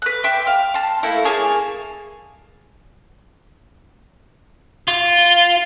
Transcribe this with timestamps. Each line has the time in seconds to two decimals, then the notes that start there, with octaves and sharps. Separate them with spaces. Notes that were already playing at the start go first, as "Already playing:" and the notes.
0.02 B4 F#6
0.24 E5 G5 C6 D6
0.47 F5
0.74 A5 C6
1.03 A3 A#3 E4
1.24 A#3 G#4 C#5 A5
4.88 F4